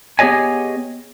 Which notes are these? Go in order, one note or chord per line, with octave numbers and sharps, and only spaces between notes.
B3 G4 G#4 C#5 D#5 G#5